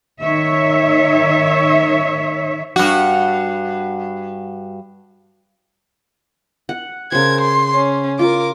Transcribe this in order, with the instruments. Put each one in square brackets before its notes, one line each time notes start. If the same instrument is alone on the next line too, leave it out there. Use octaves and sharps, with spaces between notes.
[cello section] D#3 C#5 E5
[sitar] G2 F#4
[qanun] F#5
[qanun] C#3 C5 [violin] A#4 G#6
[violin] C6
C#4
[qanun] F4 [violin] A#4 D6